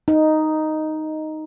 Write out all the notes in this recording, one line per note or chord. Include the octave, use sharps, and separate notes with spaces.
D#4